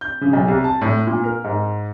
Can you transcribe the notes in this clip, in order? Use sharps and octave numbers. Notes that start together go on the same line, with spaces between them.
G6
C#3
B1
C2
A5
A2
A#2
A#4
G#2